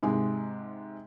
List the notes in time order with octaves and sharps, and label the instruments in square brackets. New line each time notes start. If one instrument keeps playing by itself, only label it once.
[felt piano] G#2 C3 G#3